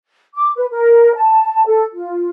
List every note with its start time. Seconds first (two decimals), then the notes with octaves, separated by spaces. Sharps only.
0.35 D6
0.56 B4
0.71 A#4
1.15 A5
1.66 A4
1.93 F4